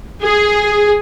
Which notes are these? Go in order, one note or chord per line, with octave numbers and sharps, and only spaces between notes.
G#4